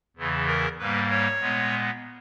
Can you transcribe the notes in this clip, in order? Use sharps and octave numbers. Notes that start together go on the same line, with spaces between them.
E2 C#3 E3
A#4
G#2 G3 A#3 B4
C#5
A#2 G#3 B3